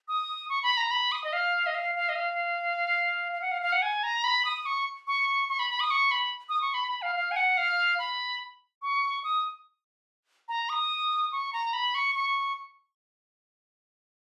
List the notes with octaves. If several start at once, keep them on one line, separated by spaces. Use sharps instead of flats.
D#6
C#6
B5
A#5
B5
D#6
D#5
F5
D#5
F5
F5
D#5
F5
F5
F#5
F5
F5
F#5
G#5
A#5
B5
D#6
C#6
C#6
C#6
B5
B5
D#6
C#6
B5
D#6
C#6
B5
B5
F5
F5
G#5
F#5
F5
B5
C#6
D#6
A#5
D#6
C#6
A#5
B5
C#6
C#6